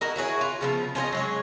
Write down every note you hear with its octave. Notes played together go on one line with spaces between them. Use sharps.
E4 F#4 A#4 D#5
E4 F#4 G#4 C#5
F4
C#3 F3 A#3 B3
C#4 F4 C5 D#5
F#3 G#3 C#5